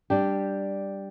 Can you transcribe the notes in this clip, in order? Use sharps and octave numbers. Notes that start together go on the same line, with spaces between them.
G3 D4 G4